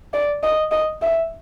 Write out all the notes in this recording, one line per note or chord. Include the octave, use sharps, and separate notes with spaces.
D5
D#5
D#5
E5